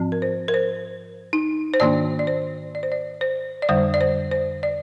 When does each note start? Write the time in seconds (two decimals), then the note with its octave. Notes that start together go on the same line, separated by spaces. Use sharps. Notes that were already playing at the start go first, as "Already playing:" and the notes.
Already playing: G#2 F3 C4
0.12 A#4
0.22 C5
0.48 A#4
0.54 C5
1.33 D#4
1.74 C5
1.80 G#2 D#3 A#3 D4 D5
2.19 D5
2.27 C5
2.75 D5
2.83 C5
2.92 D5
3.21 C5
3.62 D5
3.69 F2 D3 G3 C5
3.94 D5
4.01 C5
4.32 C5
4.63 D5